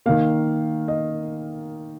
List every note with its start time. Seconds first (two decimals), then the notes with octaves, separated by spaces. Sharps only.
0.06 D#3 A#3 F5
0.88 D#5